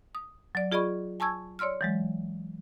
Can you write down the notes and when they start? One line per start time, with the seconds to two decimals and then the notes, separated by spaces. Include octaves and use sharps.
0.15 D#6
0.55 F#3 D5
0.72 F4 G#4 D5 D#5 B5 C#6
1.20 G#5 A5 C#6 E6 G#6
1.59 C#5 D5 C6 E6 F6
1.81 E3 F#3 G#3